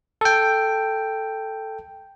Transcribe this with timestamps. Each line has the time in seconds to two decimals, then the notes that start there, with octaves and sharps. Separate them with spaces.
0.21 A4 G5